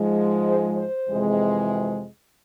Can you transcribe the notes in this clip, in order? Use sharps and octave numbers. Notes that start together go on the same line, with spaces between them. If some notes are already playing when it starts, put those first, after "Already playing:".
Already playing: G#2 F3 G#3
C5
C5
F2 C3 E3 G#3